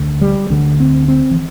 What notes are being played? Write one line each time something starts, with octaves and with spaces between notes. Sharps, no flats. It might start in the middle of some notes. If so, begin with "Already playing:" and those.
Already playing: D2 D3
G3
D2 D3 D4
C4
C4
E3